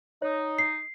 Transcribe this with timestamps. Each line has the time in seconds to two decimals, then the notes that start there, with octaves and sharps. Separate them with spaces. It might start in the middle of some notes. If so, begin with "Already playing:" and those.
0.22 D#4 C#5
0.59 C7